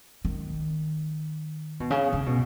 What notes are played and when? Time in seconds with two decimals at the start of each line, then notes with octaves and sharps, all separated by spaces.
0.25 D#3
1.80 B2
1.90 C#3
2.13 C#3
2.26 B2